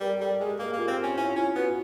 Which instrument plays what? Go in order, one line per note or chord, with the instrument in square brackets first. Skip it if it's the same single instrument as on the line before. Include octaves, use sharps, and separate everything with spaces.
[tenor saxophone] G3 [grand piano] A#4
[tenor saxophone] G3 [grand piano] A4
[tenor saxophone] G#3 [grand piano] G#4
[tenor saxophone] A#3 [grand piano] G4
[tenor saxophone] A#3
[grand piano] F4
[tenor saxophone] C4
C#4
[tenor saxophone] C#4 [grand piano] E4
[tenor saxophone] C#4 [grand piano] F4
[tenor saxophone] B3 [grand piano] F#4